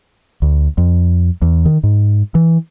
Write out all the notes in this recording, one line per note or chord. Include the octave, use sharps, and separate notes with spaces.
D2
F2
E2
D#3
G#2
E3